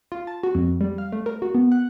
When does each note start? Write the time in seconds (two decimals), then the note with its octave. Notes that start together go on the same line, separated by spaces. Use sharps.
0.12 F4
0.27 A5
0.43 F#4
0.55 F2
0.81 G3
0.98 F5
1.12 A3
1.26 A#4
1.42 F#4
1.55 B3
1.72 F#5